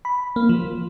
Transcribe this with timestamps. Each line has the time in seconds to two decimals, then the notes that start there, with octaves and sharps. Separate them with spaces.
0.05 B5
0.36 A#3
0.49 F3